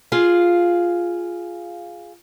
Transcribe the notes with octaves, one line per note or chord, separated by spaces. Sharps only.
F4 G#4 F5